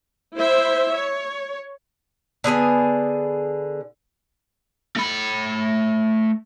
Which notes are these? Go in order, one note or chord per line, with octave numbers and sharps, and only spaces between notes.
E4 C5 E5
C#5
D3 B3 G#4 G#5
A3 B5